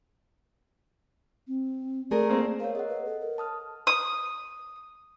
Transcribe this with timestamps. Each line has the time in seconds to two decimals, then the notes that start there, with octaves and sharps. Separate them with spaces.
1.48 C4
2.11 A3 G#4 A#4 D5
2.29 A#3 C4
2.60 A#4 C#5 F5
2.75 G#4 D#5 F#5
2.88 B4
3.05 A4
3.20 A#4
3.38 A5 D#6 F6
3.87 D#6